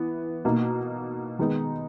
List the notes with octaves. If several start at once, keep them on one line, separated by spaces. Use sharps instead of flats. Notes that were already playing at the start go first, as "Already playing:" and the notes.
Already playing: E3 B3
B2 A#3 D#4
D#3 G#3 B3 D#4